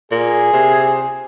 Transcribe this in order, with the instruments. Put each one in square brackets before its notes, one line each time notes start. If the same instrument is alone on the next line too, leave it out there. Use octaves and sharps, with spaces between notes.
[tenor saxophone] A#2 [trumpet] G#4
[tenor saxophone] C3